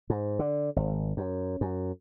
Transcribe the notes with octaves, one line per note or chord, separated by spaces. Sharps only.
G#2
D3
G#1
F#2
F#2